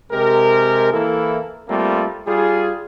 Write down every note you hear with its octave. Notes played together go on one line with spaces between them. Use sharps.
C3 G#3 G4 A#4
E3 A#3 E4 A4
G3 A3 A#3 C4 F4
G3 F4 G#4